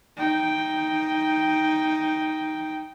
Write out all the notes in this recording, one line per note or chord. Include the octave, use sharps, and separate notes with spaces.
D#4 G5